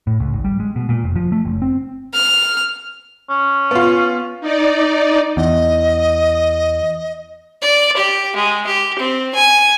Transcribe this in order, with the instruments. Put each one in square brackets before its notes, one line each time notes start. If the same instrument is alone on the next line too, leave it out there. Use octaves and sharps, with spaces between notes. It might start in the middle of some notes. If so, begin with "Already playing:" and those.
[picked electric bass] A2
C#2
G#1
G3
G#3
B2
A#2
F1
F3
A3
F#1
C4
[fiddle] F6
[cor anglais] C#4
[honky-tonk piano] B3 F4
[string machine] D#4 D5
[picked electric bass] E2 [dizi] D#5
[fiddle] D5
G4
G#3
G4
C4
G#5